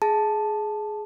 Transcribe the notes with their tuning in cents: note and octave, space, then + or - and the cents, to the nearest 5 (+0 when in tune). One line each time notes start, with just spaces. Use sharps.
G#4 +15 A5 -5